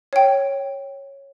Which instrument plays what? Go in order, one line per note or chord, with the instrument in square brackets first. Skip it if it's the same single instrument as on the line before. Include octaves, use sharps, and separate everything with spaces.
[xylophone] C#5 G5